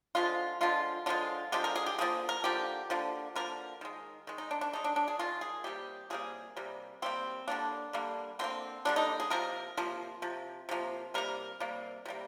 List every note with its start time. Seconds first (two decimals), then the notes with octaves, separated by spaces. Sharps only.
0.15 D3 F3 G#3 F4
0.61 D3 F3 G#3 F4
1.06 D3 F3 G#3 F4
1.52 D3 F3 G#3 G4
1.64 A#4
1.76 G#4
1.86 G4
1.98 D3 F3 A#3 G#4
2.29 A#4
2.44 D3 F3 A#3 G4
2.90 D3 F3 A#3
3.35 D3 F3 A#3 A#4
3.81 D#3 G#3
4.27 D#3 G#3
4.38 D#4
4.51 D4
4.61 D4
4.73 D#3 G#3 D#4
4.84 D4
4.96 D4
5.08 G#4
5.19 D#3 G#3 F4
5.41 G#4
5.64 C3 G3 A#3 G4
6.10 C3 G3 A#3 G#4
6.56 C3 G3 A#3
7.02 C3 G3 A#3 C4
7.48 D3 G3 A#3 D4
7.93 D3 G3 A#3
8.39 D3 G3 C4
8.44 A#3
8.85 D3 G3 A#3 D4
8.96 D#4
9.20 G#4
9.30 C3 F3 A#3 A#4
9.77 C3 F3 A#3
10.22 C3 F3
10.69 C3 F3 A#3
11.14 C3 G3 A#3 A#4
11.60 C3 G3 A#3
12.05 C3 G3 A#3